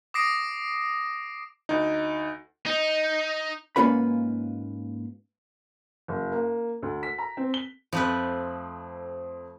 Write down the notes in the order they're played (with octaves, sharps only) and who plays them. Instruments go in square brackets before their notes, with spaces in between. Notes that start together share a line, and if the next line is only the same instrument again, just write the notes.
[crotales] D6 D#6 A#6 C7 D7
[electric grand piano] D2 D#4
[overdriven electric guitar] D#4
[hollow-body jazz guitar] G#2 A#3 C#4 F4 B4 B5
[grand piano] F#1
A#3
D2
B6
A#5
C4
G7
[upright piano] F2 C4 [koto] F3 A3 B4